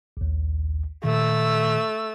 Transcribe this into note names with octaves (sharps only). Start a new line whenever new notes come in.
A#1 D#2
A#2 D#3 A3 E6